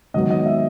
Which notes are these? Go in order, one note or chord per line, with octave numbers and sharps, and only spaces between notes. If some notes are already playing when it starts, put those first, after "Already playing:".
G#2 D#3 F#3 B3 D#5
D#5
E5